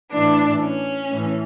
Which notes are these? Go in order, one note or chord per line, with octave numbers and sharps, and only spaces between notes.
A2 E3 D4
C#4
A2 E3